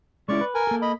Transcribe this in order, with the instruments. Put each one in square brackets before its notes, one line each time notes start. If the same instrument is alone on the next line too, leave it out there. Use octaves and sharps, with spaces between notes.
[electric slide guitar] G#3 C#4 E4 [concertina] D5 C#6
[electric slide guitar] B4
[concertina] A#4 G#5
[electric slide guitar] A#3 A4
[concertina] D#5 B5